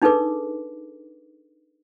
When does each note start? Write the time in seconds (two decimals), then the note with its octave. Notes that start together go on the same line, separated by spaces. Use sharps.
0.02 D4 D#4 G#4 A4 B4 D6